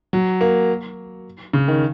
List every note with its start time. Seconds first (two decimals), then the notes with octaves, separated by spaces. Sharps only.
0.13 F#3
0.41 A#3
1.53 C#3
1.68 D#3